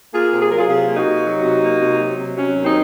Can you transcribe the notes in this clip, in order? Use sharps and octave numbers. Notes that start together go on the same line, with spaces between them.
A#3 F4 G#4
C3
G#4
F#3 A#4
F4 G#4
C3 F4 G#4
A#3
D#4 F#4
C3
F#3
C3
A#3
C3
F#3
C3
F#3 C#4
D#2
C4 D#4